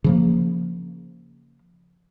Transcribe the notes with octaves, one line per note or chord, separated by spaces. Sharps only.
C#3 F3 A#3